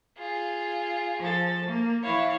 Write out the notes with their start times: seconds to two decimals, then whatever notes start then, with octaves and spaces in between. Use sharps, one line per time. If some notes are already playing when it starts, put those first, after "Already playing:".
0.18 F4 G#4
1.19 F3 A4 A6
1.65 A#3
2.03 E3 E4 C#5 F5